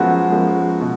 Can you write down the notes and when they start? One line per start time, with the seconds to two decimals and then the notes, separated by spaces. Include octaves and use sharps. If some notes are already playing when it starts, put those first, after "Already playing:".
Already playing: F#2 F3 G#3 B3 F#4
0.30 F#2 F3 G#3 B3
0.81 B2